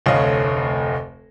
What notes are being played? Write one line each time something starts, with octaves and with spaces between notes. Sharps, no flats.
F1 D2 C#5 D#5 F5